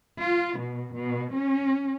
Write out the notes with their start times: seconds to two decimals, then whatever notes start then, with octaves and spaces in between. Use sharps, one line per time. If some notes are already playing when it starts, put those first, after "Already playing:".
0.19 F4
0.58 B2
0.96 B2
1.36 C#4